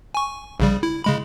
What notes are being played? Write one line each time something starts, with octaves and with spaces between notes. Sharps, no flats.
G#5 C#6
A#1 C#3 G3
E4
C#3 G#3 B5